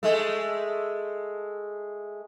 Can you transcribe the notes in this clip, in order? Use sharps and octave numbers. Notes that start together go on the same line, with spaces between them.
G#3 A3